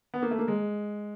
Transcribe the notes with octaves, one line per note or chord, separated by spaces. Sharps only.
B3
A#3
A3
A#3
G#3